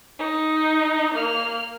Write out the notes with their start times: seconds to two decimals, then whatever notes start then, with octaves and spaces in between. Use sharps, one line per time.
0.19 D#4
1.14 A#3 F6